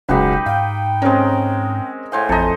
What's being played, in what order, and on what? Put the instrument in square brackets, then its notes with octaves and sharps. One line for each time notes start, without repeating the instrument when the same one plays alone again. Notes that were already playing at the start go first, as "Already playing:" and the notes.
[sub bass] E1 [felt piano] C#2 F#3 G#3 [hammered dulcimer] D#4 G4 B4 [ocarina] F#5
[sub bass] G#2 [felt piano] F5 [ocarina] G5
[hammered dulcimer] G#3 A#4 [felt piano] C4 C#4
[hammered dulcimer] A2 C5 F5 [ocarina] G#5
[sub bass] A1 [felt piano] F2 A#5 [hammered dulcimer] A4 D#5